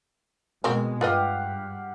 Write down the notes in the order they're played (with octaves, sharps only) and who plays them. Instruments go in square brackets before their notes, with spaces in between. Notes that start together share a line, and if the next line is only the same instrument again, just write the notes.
[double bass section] B2 G#3 [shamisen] C4 F#4 A#4
[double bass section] G2 [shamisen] F4 B4 D#5 [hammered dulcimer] G4 F5 F#5